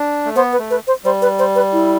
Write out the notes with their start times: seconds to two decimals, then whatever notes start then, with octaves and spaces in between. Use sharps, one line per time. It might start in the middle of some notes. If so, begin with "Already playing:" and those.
Already playing: D4
0.25 A3
0.36 B3 C5
0.53 B4
0.59 A3
0.70 B4
0.87 C5
1.04 G3 C5
1.22 B4
1.39 C5
1.55 B4
1.73 E4